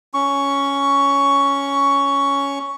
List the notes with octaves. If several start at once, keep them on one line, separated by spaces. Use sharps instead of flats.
C#4 C#6